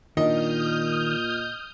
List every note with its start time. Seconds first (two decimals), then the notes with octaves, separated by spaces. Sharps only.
0.17 A#2 D#3 D4 D#5 D#6 F6 G6